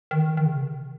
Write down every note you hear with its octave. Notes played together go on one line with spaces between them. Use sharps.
D#3
E3
D#3
C#3
C3